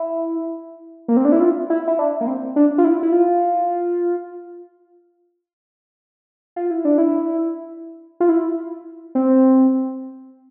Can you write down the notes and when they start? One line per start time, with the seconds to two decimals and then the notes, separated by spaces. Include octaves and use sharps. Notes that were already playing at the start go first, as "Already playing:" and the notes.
Already playing: E4
1.08 A#3
1.17 C4
1.25 D4
1.32 E4
1.40 F4
1.70 E4
1.88 E4
1.99 D4
2.21 A#3
2.27 C4
2.56 D4
2.78 F4
2.84 E4
3.03 E4
3.12 F4
6.56 F4
6.71 E4
6.85 D4
6.98 E4
8.20 F4
8.29 E4
9.15 C4